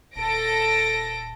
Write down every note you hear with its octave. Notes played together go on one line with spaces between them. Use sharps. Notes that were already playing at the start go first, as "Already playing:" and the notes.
D#1 A4 A#6 D7